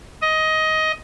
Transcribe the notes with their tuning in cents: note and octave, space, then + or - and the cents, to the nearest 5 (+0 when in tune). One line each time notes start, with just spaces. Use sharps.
D#5 +15